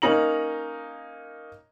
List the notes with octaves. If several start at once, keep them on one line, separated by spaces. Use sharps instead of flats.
A#3 C#4 D#4 A#5 F#7